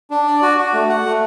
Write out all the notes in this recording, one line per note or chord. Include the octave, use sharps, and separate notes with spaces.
D4
D5
F#4
F#4
A3
F#5
A3